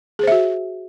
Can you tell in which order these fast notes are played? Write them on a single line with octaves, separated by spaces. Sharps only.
G#4 C5 E5 F#4